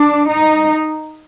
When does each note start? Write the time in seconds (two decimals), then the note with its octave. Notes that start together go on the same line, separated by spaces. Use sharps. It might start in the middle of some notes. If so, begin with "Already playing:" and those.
Already playing: D4
0.29 D#4